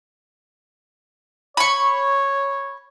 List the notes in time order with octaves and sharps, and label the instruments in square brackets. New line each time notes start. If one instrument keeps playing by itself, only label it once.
[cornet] C#5 [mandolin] B5 C#6